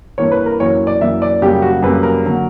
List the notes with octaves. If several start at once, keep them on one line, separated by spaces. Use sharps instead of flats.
G2 E3 A#3 C#5
B4
A#4
F#2 E3 A#3 C#5
D5
F#2 E3 A#3 E5
D5
F#2 C#3 G3 A#3 G4
F#4
F#2 C#3 G3 A#3 B4
A#4
D3 F#3 A#3